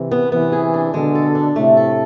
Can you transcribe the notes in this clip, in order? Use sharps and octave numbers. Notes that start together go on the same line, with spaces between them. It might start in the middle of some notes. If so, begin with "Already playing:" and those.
Already playing: C3 E3
B3
C3 E3 B3
G#4
D4
B2 D3 G#3
A4
D4
A2 C3 A3
A4